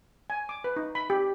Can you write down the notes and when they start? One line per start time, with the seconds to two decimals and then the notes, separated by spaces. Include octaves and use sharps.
0.30 G#5
0.49 D6
0.64 B4
0.76 D#4
0.95 B5
1.10 G4